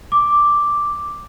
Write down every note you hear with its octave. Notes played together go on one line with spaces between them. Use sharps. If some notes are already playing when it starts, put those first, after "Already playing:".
D6